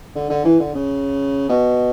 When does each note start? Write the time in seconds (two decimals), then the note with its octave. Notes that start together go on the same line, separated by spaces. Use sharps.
0.16 D3
0.30 D3
0.45 E3
0.60 D3
0.75 C#3
1.49 B2